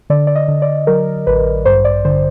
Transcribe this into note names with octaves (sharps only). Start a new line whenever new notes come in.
D3 D5
D5
D#5
D3
D5
F#3 A#4
A1 B4
G2 C5
D5
D3 C5